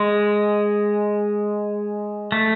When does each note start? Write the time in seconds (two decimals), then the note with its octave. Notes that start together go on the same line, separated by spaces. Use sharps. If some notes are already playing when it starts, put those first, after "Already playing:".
Already playing: G#3
2.32 A3